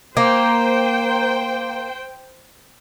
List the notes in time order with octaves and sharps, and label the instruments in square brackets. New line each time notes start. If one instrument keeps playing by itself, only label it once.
[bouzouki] A#3 [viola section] C5 G5